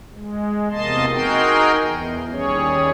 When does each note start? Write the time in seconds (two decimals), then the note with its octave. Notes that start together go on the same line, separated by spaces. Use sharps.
0.13 G#3
0.71 E2 C3 A#3 D#5 A5 C6
1.10 D#4 F#4 G#4 A#4 G5 C6
1.81 E2
2.30 D#2 G3 C#4 G#4 C#5